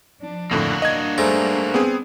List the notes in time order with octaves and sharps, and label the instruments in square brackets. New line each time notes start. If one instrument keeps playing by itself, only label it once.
[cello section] F3 D4
[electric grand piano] F2 A2 D3 [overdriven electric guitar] A#3 F#4
[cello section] G3 D4 [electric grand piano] D#5 G#6
[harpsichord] G#2 A3 [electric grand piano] A#6
[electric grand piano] B3 C4 G#4